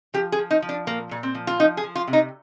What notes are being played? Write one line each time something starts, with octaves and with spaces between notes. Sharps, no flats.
F3 G4
G#4
F3
D#4
F3
D4
A#2 A#3
A#2
C4
F3
F4
F3 D#4
G#4
F3
F4
C3
D#4